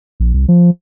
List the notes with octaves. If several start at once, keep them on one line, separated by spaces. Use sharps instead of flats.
A#1
C2
F3